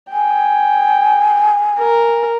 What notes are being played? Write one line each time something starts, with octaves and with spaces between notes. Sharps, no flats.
G5 G#5
A#4